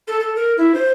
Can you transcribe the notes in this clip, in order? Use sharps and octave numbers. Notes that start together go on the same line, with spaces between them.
A4
A4
A#4
E4
C5